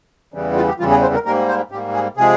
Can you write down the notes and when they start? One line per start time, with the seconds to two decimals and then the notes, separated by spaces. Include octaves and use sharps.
0.34 E2 C#3 E3 G3
0.56 F4
0.68 G4
0.79 E2 C#3 E3 G3 F4
0.91 G#4
1.02 C5
1.14 A#4
1.25 G#2 G3 A#3 A#4
1.48 C5
1.71 G#2 G3 A#3 G4
1.93 G#4
2.17 C3 F3 G#3 G#4